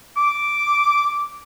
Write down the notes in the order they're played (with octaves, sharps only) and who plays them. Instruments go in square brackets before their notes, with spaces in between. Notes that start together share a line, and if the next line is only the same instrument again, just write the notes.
[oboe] D6